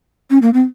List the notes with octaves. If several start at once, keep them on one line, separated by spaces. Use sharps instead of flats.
C#4
A#3
C4